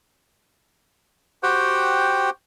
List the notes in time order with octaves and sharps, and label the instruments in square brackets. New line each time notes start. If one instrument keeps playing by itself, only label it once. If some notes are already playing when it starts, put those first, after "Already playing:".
[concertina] F#4 G4 C5 F#5 G5